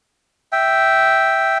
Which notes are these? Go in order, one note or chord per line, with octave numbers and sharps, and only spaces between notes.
E5 G5